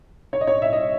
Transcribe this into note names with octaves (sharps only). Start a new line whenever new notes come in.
C#5
D#5
C#5
E5
D#5